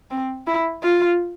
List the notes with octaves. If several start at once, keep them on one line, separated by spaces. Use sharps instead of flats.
C4
E4
F4